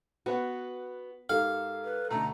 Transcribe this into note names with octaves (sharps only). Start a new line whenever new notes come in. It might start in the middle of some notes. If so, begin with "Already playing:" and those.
B3 F#4 B4 F#5
G#2 G4 A4 A#4 F5
B4
D2 B2 A3 A#5